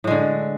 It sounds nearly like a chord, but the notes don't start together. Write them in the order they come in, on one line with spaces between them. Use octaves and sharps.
A2 G#3 D3